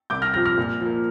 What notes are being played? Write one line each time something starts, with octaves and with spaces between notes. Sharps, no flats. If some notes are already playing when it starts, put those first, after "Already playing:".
C2 D6 G6
F6 A#6
C3 F3 F6 A#6
F6 A#6
A#2
F3 A#3